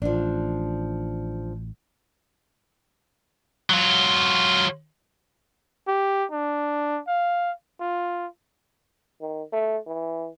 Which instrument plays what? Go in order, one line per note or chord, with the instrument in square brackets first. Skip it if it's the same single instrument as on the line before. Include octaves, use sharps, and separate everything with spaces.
[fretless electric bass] A1 [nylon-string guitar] F3 D4
[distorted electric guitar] F#3 F4
[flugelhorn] G4
D4
F5
F4
[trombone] D#3
A3
E3